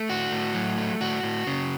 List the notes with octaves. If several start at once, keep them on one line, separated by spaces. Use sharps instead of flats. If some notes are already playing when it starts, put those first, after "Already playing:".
Already playing: A3
A2 F#4
A2
F#3
A3
A2 F#4
A2
C#3